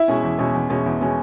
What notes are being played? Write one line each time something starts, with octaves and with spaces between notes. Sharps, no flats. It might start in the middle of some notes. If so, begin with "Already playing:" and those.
Already playing: E4 E5
B2 G#3 C#4
E2
B2 G#3 C#4
E2
B2 G#3 C#4
E2
B2 G#3 C#4